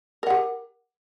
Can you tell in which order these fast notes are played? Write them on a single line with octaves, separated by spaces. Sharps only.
A#4 F#5 G4